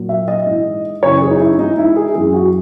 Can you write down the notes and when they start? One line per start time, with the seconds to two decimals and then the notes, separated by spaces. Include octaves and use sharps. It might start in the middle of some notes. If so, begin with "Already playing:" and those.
Already playing: A#2 F#3
0.09 E5
0.28 D#5
0.46 G#2 E3
1.03 F#2 C#3 E3 C#5
1.22 G#4
1.31 D#4
1.40 E4
1.58 G#2 E3 D#4
1.78 E4
1.96 G#4
2.15 F#2 E3 G#4
2.34 F#4